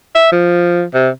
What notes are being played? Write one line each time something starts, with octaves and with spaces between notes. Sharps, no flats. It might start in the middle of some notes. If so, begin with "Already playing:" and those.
E5
F3
C3